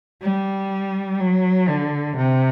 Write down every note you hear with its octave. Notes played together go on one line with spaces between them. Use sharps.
G3
F#3
D3
C3